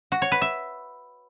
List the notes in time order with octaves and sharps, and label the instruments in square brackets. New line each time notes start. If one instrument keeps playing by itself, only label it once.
[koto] F#4
C#5
B4
E5